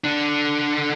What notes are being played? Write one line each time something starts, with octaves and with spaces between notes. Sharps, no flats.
D3 D4